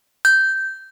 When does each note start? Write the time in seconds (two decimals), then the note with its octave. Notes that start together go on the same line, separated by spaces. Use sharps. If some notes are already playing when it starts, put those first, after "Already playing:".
0.25 G6